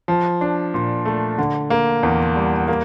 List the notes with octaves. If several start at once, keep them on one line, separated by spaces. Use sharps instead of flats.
F3
D4
A#2
A3
D3
A#3
E2
G3
A#3